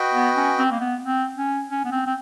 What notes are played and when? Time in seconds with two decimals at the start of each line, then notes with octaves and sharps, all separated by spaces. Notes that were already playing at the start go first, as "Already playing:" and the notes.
Already playing: F#4 B4 D#5 G5
0.14 B3
0.36 C#4
0.58 C4
0.72 A#3
0.80 B3
1.02 C4
1.36 C#4
1.69 C#4
1.85 B3
1.92 C4
2.07 C4